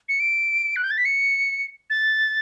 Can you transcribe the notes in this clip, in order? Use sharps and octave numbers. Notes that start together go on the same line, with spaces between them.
C#7
D7
F#6
G6
A6
B6
C#7
A6